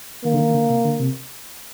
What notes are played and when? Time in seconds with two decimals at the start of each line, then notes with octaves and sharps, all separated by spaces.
0.25 D#3 A#3
0.34 D3
0.40 D#3
0.55 D3
0.70 C3
0.85 D3
0.99 C3